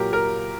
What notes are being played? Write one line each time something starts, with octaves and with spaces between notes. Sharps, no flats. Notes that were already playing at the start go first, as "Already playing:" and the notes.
Already playing: A#2 F#3 G4 A#4
A#4